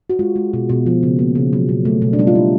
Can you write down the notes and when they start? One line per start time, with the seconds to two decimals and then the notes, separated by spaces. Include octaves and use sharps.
0.10 F#4
0.19 G#3 F4
0.36 G#3
0.54 B2
0.69 B2
0.86 F3
1.03 C#3
1.19 A#3
1.35 C#3
1.53 F#3
1.69 B2
1.85 A3
2.02 B2
2.13 D4
2.19 G3 D#4
2.27 F4
2.35 B2 E4